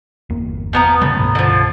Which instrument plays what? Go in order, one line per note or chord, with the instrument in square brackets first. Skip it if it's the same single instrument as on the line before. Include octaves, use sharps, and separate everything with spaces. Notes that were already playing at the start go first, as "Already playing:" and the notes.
[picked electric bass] G1 E2 A#3
[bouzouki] F3 B3 A#5
[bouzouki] A2 [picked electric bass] C#3 G3
[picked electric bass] C2 G2 B2
[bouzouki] D3 F3